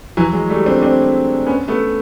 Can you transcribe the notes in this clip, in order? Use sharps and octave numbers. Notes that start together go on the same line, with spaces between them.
E3 F#3
F#3 G#3
G3 A3
C4 D4
C4 D4
B3 C#4
A3 B3